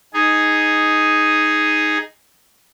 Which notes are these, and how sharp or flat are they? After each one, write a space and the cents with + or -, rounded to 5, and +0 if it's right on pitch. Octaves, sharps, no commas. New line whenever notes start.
D#4 +0 G#4 +0